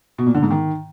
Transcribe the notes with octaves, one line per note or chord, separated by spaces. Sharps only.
B2
A#2
D3
G#2
D#3